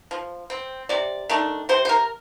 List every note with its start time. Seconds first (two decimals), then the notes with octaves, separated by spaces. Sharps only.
0.11 F3
0.50 C4
0.89 C3 D5
1.29 D#3 A3 D4
1.69 C3 C5
1.85 C5
1.89 A#4